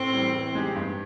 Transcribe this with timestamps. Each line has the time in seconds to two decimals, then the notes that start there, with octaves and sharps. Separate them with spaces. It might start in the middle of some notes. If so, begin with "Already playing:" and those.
Already playing: A2 C4
0.13 E3 G3
0.34 E3
0.55 G#3 C4 D#4 G4
0.76 G2